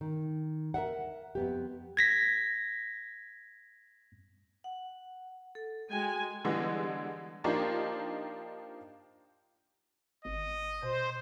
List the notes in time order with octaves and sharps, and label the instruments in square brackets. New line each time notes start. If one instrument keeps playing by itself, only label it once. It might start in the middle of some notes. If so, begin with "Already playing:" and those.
[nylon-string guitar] D#3
A#4 D5 E5 F#5
F2 B3 G4
[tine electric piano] G#6 A#6 B6
[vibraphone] F#5
A4
[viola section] G#3 G#5 [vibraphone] F#4 G5
[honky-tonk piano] D3 E3 G3 G#3 B3
F3 A#3 D4 D#4 F4 G4
[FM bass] G#1 [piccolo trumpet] D#5
[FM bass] B2 [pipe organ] C5